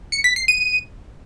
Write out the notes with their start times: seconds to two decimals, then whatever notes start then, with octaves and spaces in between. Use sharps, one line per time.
0.12 C#7
0.24 B6
0.36 C7
0.48 D#7